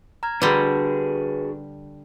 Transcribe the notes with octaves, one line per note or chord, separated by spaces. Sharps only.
A#5 F6 G#6
D3 G3 D4 F#4 G#4 B4